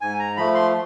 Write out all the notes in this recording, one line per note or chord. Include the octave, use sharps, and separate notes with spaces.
G#2 G#5
A#5
F3 A3 B5
C6